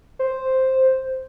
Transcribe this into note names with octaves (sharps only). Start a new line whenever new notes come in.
C5